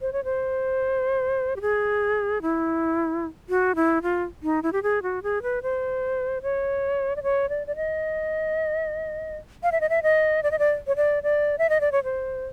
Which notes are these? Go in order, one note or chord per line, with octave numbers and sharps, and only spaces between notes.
C5
C#5
C5
G4
G#4
E4
F#4
E4
F4
D#4
E4
G4
G#4
F#4
G#4
B4
C5
C#5
D5
C#5
D5
D5
D#5
F5
E5
D#5
E5
D#5
D5
D#5
D5
C#5
D5
D5
E5
D#5
D5
C#5
C5